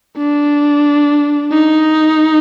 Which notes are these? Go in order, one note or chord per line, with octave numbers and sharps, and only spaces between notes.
D4
D#4